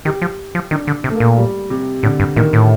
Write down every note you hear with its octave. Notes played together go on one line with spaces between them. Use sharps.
D#3 G4
F3
F3
D#3 D4
D3
C3
A3
A#3
A#2
G3
C3
A2 D3
G2
A#2 D#3
A2